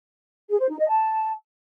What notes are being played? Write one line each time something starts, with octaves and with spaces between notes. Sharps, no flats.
G#4
C5
D#4
D#5
A5